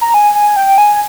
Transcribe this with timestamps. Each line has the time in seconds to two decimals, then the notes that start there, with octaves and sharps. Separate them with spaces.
0.01 A#5
0.14 G#5
0.35 G#5
0.56 G5
0.78 G#5